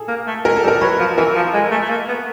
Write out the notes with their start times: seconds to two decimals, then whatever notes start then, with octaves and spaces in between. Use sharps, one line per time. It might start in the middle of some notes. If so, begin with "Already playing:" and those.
Already playing: G#4 A4
0.08 A#3
0.27 A3
0.45 G#3 A#4
0.56 A4
0.64 G3
0.68 A#4
0.81 F#3 B4
0.99 F3
1.18 E3 A#4
1.35 F3
1.53 G#3 A4
1.71 A3
1.82 A3
1.89 A#3
2.08 B3